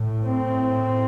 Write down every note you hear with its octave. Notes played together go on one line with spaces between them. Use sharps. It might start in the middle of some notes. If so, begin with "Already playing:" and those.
Already playing: A2
C4